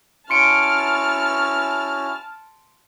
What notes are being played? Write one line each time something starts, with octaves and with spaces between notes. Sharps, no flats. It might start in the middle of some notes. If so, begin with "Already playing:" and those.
C#4 E4 F#4 A5 C6 F6 C#7 D7